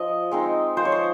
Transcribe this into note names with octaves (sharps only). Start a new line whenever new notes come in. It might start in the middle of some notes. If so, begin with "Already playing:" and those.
Already playing: F3 D#5
G#3 C4 D#4
F3 C5
C#5
C5